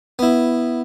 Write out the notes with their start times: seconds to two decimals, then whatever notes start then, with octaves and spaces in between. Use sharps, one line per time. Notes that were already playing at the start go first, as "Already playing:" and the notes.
0.19 B3 E4